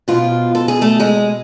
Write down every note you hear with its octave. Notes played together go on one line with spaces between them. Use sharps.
B2 F3 F4
A4
G#4
A3 A4
G#3 G#4